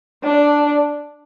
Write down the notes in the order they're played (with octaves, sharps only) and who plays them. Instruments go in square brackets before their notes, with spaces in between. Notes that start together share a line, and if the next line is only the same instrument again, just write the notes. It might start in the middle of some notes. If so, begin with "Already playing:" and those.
[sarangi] D4